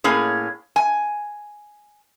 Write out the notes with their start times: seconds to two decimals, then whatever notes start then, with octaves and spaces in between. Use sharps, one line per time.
0.04 A2 A#3 C#4 G#4
0.76 G#5